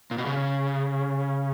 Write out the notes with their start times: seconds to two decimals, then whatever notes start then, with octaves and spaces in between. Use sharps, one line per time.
0.11 A#2
0.18 B2
0.26 C#3